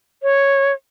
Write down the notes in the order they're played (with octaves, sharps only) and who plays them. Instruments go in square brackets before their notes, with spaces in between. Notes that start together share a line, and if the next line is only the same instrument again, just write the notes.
[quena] C#5